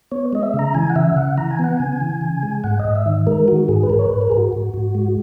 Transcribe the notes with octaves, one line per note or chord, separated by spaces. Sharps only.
B3 C#5
G#3 D#5
E5
C#3
A#5
E3 G#5
F#5
C#3 E5
C#3 F#5
E3 A#5
G#5
B3 F#5
C#3 G#5
E3
C#3
G#3
G#2 F#5
D#5
G#2
E5
D#3
G#3 A#4
D#3 F#4
G#2 G#4
B4
G#2 A#4
C#5
B4
G#2
A#4
G#2 G#4
F#4
G#2
G#2
G#3